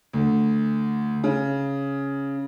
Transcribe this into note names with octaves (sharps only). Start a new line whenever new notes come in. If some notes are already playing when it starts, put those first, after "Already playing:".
D2
C#3